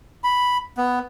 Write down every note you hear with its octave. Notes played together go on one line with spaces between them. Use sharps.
B5
B3